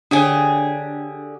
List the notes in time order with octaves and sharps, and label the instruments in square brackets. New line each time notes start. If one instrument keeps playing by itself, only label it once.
[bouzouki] D3 G4 G#4 [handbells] D4 C#5